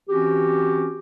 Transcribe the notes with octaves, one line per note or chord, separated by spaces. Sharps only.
E3 C4 C#4 F#4 G4